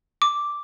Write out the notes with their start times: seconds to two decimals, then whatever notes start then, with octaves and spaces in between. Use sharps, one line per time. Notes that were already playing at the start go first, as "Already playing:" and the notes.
0.22 D6